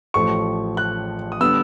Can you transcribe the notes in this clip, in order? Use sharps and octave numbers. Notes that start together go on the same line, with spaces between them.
A1 A2 F3 A3 C#6
F#6
D#6
D3 G3 B3 E6